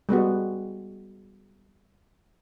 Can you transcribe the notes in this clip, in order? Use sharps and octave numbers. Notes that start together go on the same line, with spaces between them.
G3 G#3 B3 F#4